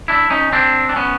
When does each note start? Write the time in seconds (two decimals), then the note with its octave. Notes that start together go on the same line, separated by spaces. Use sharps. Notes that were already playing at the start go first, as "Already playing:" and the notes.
0.08 D4 E4
0.30 C#4 D#4
0.52 C4 D4
0.89 D4
0.96 B3 C#4